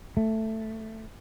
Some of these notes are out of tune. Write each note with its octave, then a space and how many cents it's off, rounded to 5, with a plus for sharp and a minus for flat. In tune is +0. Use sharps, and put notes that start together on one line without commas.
A3 +5